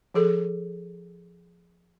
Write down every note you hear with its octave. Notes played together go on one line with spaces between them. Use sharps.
F3 G#4 A4